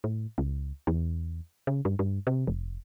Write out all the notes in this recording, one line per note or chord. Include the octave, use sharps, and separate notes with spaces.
A2
C#2
E2
C#3
G2
G2
C3
F1